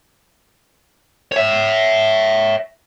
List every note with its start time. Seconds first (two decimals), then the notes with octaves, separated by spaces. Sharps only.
1.32 C#5 E5